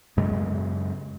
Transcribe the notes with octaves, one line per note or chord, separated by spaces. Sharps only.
F#2 C#3 G#3 B3